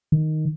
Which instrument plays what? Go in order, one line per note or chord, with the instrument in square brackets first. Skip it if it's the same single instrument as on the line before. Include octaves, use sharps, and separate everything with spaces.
[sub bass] D#3